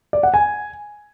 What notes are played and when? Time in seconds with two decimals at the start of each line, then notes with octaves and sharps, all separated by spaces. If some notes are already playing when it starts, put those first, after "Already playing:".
0.13 D5
0.23 F#5
0.34 G#5